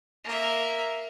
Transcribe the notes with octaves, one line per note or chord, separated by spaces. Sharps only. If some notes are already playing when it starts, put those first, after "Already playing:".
A#3 E5